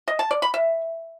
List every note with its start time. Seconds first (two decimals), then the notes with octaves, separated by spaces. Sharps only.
0.08 D#5
0.19 A5
0.31 D5
0.42 B5
0.54 E5